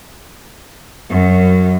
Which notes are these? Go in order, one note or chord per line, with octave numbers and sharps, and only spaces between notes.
F#2